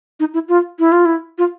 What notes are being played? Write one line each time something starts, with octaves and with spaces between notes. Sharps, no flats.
D#4
E4
F4
E4
F4
E4
F4